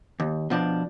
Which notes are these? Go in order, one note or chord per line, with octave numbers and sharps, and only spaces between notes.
D#2
B2 F3 D4